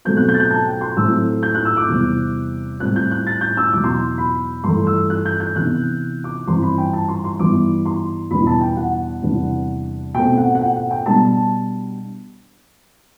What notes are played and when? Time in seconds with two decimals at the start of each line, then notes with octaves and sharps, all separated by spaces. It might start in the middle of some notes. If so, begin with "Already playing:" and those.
0.05 B2 F#3 A3 C4 G6
0.17 F#6
0.28 G6
0.34 A6
0.40 G6
0.51 A5
0.66 G5
0.81 C6
0.96 A2 F#3 A3 C4 E6
1.43 G6
1.54 F#6
1.65 E6
1.77 D6
1.88 E2 C3 G3 C4
2.80 A2 G3 C4 F#6
2.96 G6
3.11 F#6
3.27 A6
3.41 G6
3.57 E6
3.72 E2 B2 F#3 D6
3.84 C6
4.18 B5
4.64 G2 E3 A3 C6
4.87 E6
5.10 F#6
5.25 G6
5.40 G6
5.56 C3 E3 B3 D4 F#6
6.24 D6
6.47 G2 E3 G3 C4 C6
6.62 B5
6.78 G5
6.93 A5
7.08 C6
7.24 C6
7.39 G2 E3 G3 B3 D6
7.85 C6
8.31 E2 B2 G3 B3 D4 B5
8.47 A5
8.61 G5
8.77 F#5
9.22 E2 C3 G3 B3 D4
10.14 B2 A3 C4 G5
10.37 F#5
10.55 F#5
10.61 G5
10.76 F#5
10.91 G5
11.06 B2 G3 D4 A5